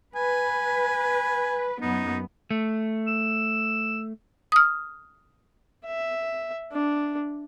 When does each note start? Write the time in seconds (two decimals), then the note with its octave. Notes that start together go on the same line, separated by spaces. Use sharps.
0.16 B4 G#5
1.81 F#2 B3 D#4
2.51 A3
3.07 E6
4.52 D#6 F6
5.86 E5
6.72 D4